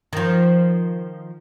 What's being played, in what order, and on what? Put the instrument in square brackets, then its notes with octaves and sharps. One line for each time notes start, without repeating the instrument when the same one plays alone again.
[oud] D#3 F3